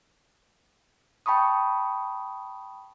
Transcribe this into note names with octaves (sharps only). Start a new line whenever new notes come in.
G5 A5 B5 C#6 D#6